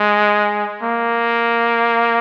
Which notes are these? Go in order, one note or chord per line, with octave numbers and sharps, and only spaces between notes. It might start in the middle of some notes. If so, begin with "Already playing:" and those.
Already playing: G#3
A#3